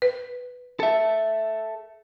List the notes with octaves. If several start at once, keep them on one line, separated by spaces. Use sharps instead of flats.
B4
A4 E5